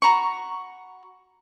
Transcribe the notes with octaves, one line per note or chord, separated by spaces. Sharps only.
F#4 A#5 B5 C#6